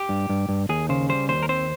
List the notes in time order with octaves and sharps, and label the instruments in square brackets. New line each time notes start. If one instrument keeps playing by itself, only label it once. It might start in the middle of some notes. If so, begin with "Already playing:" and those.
Already playing: [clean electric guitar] G4
G2
G2
G2
D#2 G#4
C#3 C5
G3 C5
D#2 C5
A#4
C4 C5